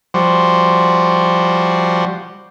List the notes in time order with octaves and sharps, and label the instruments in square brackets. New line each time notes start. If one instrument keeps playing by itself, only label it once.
[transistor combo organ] F3 G3 F#4 C5